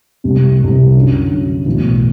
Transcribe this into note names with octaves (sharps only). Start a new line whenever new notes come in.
C2 C3 G3
C2 C3 G3
F#2 D3 F#3
F#2 D3 F#3
B1 A2 E3